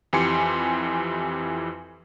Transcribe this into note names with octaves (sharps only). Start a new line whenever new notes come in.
F2 E3 G4 G#5 C6 C#7